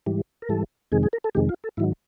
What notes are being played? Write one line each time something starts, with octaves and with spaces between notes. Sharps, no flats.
G#2 E3 G3
A#4
G#2 E3 G3 A4
F2 C3 D#3 G#3 G#4
G#4
A#4
A4
F2 C3 D#3 G#3 G4
F4
A4
G#2 D#3 F#3 E4